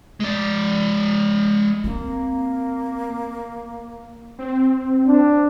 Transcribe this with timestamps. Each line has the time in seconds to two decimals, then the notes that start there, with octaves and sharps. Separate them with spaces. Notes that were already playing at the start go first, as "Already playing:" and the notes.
0.20 G#3 D5
1.84 A#3 C4
4.39 C4
5.06 D4